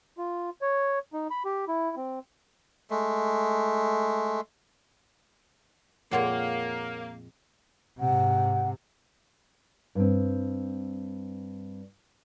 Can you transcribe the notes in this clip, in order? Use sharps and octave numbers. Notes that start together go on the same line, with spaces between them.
F4
C#5
D#4
B5
G4
E4
C4
G#3 A3
F2 A#2 G#3 A#3 C#5 F#5
G#2 C3 F#5
G2 C4